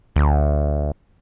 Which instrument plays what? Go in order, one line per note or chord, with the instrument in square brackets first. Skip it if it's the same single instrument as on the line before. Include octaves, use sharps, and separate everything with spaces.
[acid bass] D2